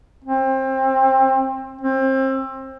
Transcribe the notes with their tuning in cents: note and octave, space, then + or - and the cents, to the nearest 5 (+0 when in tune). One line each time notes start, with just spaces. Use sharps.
C4 +25
C4 +30